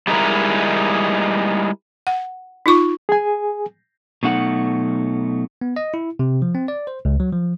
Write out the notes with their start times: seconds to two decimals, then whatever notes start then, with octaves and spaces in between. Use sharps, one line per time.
0.08 G3 G#3 D#4 E4 A#4
2.07 F#5
2.66 D#4 F4 C#6 D6
3.09 G#4 G#5
4.23 B2 F#3 A3 D#4 F#5
5.61 B3
5.76 D#5
5.94 E4
6.19 C3
6.42 F3
6.55 C4
6.68 D5
6.87 C5
7.05 C#2
7.20 F#3
7.32 F3